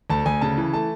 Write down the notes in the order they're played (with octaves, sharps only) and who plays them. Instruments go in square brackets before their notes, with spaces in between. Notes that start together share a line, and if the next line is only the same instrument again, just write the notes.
[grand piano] D2 A5
D2 G#5
C#3 A5
E3
A3 A5